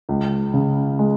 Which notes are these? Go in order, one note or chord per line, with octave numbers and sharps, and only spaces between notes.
C#2
C#3
G#3